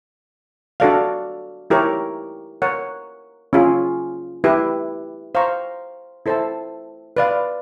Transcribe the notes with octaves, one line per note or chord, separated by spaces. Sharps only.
D4 F#4 A4 D5 F5
E4 G4 A#4 C#5
A#4 C#5 F#5
C#4 F4 G#4
E4 G4 B4
C5 F5 A#5 C#6
E4 A4 C5 E5 A5
B4 D5 F5